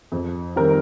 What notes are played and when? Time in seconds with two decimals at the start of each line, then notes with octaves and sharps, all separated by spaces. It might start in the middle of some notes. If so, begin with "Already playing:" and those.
0.12 F2
0.56 D#3 G3 C4 A#4